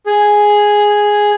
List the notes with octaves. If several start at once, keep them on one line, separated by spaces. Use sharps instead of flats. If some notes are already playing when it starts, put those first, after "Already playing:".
G#4